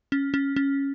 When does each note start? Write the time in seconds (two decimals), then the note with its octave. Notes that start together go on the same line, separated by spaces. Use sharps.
0.12 C#4
0.34 C#4
0.56 C#4